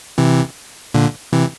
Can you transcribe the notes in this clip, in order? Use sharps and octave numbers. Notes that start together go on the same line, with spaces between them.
C3 E3
A#2 D3
C3 E3